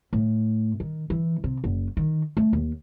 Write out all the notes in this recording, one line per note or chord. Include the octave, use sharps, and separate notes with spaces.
A2
D#3
E3
C3
F#1
D#3
A3
D#2